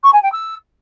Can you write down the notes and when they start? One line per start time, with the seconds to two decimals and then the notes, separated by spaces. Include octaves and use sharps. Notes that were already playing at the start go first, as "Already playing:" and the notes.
0.03 C#6
0.13 G#5
0.22 G5
0.32 E6